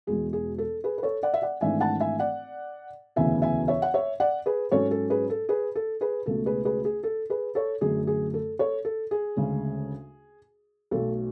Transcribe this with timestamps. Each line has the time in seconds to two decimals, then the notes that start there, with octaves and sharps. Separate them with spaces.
0.07 E1 E2 B2 G#3 G#4
0.33 G#4
0.58 A4
0.84 G#4 B4
0.98 B4
1.03 A4 C#5
1.23 D5 F#5
1.34 E5
1.42 D5 F#5
1.61 G#1 G#2 E3 A3 D4 E5 G#5
1.80 F#5 A5
2.00 E5 G#5
2.20 D5 F#5
3.16 E1 D2 C#3 E3 B3 E5 G#5
3.42 E5 G#5
3.68 C#5 E5
3.82 F#5
3.94 C#5 E5
4.20 D5 F#5
4.46 G#4 B4
4.72 G#2 F#3 C#4 A4 C#5
4.91 A4
5.10 G#4 B4
5.30 A4
5.49 G#4 B4
5.75 A4
6.01 G#4 B4
6.26 C#2 B2 A3 A4
6.46 G#4 B4
6.65 G#4 B4
6.85 G#4
7.03 A4
7.30 G#4 B4
7.55 A4 C#5
7.81 F#2 D3 A3 G#4
8.07 G#4
8.34 A4
8.59 A4 C#5
8.85 A4
9.11 G#4
9.36 D2 C#3 G#3 C#4
10.91 B1 B2 F#3 A3 A4